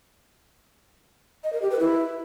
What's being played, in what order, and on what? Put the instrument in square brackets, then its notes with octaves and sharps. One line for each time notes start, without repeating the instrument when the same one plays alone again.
[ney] D#5
A#4
G4
B4
E4